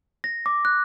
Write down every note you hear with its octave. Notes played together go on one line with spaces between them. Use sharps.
A#6
D6
F#6